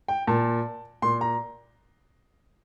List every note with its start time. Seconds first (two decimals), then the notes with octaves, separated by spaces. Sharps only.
0.08 G5
0.27 A#2 A5
1.02 A#2 C6
1.21 A#5